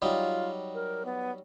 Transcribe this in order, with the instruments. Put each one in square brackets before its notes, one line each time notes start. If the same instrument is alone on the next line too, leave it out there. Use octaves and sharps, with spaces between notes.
[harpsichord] F#3 G3 D#4 [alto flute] F4
[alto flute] A#4
B3